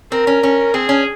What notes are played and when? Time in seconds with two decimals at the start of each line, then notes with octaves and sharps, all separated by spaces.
0.11 C4 A#4
0.27 C#4
0.43 C#4
0.74 C4 G#4
0.89 C#4